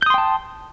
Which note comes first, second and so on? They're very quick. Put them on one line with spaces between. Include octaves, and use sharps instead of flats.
G6 D#6 C6 G5 A5